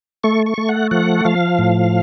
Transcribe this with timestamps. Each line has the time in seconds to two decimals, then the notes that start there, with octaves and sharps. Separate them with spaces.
0.24 A3 C#6
0.46 C#6
0.58 A3
0.69 F#5
0.91 F3 F#5
1.25 F3 F5
1.59 A2